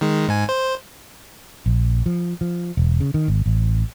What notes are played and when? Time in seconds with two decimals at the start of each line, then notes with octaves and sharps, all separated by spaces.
0.01 D#3 G#3
0.28 G#2 G#5
0.49 C5
1.66 A#1
2.06 F3
2.41 F3
2.77 E1
3.00 C#3
3.14 D#3
3.28 G#1
3.46 A1